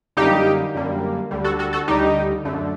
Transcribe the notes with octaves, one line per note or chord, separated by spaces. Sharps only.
F#2 D3 G3 A#3 D#4 G4
F#2 D3 G3 A#3
D2 D3 G3
F#4 A4
F#4 A4
F#4 A4
D2 D3 G3 D#4 G4
F#2 D3 A3